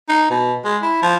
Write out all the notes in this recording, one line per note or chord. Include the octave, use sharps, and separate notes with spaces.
D#4
B2
G#3
E4
F3